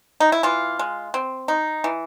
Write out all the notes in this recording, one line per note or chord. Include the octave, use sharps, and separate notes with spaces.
D#4
E4
E3 F4
G#3
C4
D#4
E3